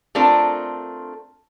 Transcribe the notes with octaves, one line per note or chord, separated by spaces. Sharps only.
A3 C4 D4 F4 A4 A#4